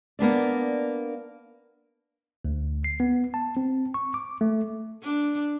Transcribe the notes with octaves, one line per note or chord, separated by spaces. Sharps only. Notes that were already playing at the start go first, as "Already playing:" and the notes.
A#3 B3 D4 D5
D2
C7
B3
A5
C4
C#6
D6
A3
D4